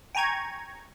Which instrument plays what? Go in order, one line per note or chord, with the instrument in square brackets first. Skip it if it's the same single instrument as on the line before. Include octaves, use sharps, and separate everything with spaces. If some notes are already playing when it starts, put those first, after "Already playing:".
[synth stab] G5 G#5 A#5 C#6 G#6